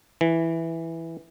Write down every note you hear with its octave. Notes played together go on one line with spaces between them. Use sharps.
E3